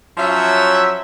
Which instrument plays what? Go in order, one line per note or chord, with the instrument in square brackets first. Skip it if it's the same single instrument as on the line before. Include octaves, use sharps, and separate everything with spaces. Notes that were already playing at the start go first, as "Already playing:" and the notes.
[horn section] F3 F#3 C#4 E5